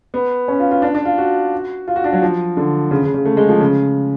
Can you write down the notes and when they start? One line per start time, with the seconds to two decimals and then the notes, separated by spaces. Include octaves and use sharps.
0.14 B3
0.48 C#4
0.60 F4
0.71 F4
0.82 D4
0.95 D4
1.05 F4
1.18 F#4
1.88 F4
1.96 F#4
2.04 D4
2.13 F#3
2.22 F3
2.57 D3
2.91 C#3
3.03 C#3
3.14 C#3
3.25 A3
3.37 G#3
3.49 F3
3.60 C#3